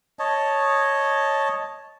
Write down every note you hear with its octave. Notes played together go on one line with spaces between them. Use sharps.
C#5 D#5 A5